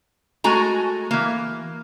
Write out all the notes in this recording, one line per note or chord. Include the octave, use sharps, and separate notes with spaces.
G#3 A3 F#4 G#5 A#5
E3 A#3